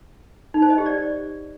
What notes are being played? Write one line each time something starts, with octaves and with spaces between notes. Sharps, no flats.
D#4
C5
D#5
G4
D5